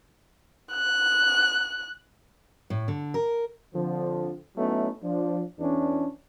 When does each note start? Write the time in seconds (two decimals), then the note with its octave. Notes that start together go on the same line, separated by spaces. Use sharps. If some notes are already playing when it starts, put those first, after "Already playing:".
0.73 F#6
2.70 A2
2.88 D3
3.14 A#4
3.74 D3 F3 C4
4.56 F#3 A3 B3 C#4 D#4 E4
5.02 F3 D4
5.59 E2 E3 C#4 D4